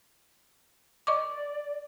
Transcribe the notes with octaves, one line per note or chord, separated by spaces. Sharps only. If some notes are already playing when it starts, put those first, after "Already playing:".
D5 D#5 C#6 D6